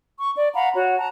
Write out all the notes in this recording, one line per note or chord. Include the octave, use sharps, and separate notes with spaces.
C#6
D5
F5 F#5 A#5 B5
F#4 C#5 F#5
A5 A#5